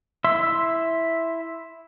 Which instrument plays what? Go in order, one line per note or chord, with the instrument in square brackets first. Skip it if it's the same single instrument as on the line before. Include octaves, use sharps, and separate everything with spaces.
[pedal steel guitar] E4 E5 C6 E6